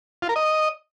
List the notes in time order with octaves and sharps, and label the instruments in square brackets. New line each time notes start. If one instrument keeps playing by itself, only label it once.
[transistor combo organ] F4
A#4
D#5